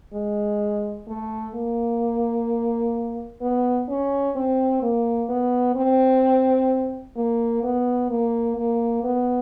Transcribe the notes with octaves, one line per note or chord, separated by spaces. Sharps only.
G#3
A3
A#3
B3
C#4
C4
A#3
B3
C4
A#3
B3
A#3
A#3
B3